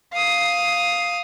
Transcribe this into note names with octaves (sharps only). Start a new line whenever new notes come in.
F5 D#6